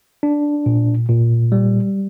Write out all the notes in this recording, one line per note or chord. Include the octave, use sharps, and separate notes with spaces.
D4
A#2
A#2
G3